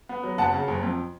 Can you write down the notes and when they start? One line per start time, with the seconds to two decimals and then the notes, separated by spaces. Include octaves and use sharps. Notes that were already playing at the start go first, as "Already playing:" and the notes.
0.09 B3
0.23 F#3
0.38 F#1 F#5 A5
0.53 C#3
0.68 F#1
0.83 F2